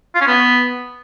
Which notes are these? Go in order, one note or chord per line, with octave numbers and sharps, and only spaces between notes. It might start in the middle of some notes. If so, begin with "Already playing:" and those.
F4
C#4
B3